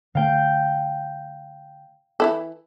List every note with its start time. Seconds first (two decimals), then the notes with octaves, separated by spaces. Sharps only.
0.15 D3 A3 F5 G5
2.20 E3 E4 A4